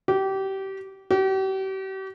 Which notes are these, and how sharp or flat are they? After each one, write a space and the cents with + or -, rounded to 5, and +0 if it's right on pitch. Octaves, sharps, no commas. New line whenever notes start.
G4 -25
G4 -40